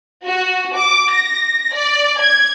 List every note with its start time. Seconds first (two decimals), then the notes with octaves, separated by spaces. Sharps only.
0.25 F#4
0.75 D6
1.12 A#6
1.74 D5
2.20 G#6